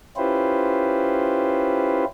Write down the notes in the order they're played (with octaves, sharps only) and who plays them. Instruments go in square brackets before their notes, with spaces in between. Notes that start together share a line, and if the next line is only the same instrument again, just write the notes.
[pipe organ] C#4 E4 F4 G4 B4 C5